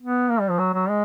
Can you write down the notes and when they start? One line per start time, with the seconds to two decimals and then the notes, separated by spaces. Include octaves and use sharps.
0.01 B3
0.31 A#3
0.40 G3
0.50 F3
0.59 F#3
0.74 F#3
0.89 G#3